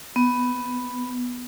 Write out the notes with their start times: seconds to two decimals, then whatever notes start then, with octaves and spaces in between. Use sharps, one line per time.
0.16 B3